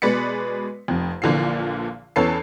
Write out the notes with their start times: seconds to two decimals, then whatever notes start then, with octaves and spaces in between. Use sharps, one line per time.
0.02 B2 G#3 B4 D5 B6 C#7
0.88 F1 F2
1.22 A#1 A#2 D3 E3 C7
2.16 E2 C#4 A4 B4 A5 C7